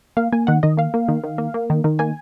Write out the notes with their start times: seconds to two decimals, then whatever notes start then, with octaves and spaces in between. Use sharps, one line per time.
0.17 A#3 F5
0.33 A#3 G#5
0.47 D#3 F#5
0.63 D#3 D#5
0.77 A#3 F5
0.94 A#3
1.08 D#3
1.24 D#3
1.38 A#3
1.54 A#3
1.70 D#3
1.84 D#3
1.99 A#3 G#5